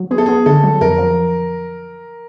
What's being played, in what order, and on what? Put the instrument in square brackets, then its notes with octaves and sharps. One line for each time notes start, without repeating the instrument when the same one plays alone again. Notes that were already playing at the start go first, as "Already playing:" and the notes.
Already playing: [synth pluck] F#3
[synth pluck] B3 [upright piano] G#4
[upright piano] A4
[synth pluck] B3 [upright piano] G#4
[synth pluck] D3 [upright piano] A4
[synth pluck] F#3
[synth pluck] F2 [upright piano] A#4
[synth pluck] F3